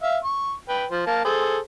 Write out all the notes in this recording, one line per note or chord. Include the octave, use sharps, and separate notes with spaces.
E5 F5
C#6
B4 G5
F3 C5
A#3 F5 A5
G#4 A4 C5